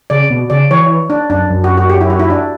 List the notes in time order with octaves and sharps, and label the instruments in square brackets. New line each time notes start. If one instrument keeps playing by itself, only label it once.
[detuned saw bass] C#3 [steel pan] D5
[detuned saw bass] B2
[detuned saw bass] C#3 [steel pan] D5
[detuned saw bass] E3 [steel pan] C#5
[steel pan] D4
[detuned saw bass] F#2 [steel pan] D4
[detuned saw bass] F#2
[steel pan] F#4
F#4
G4
E4
F#4
E4
D4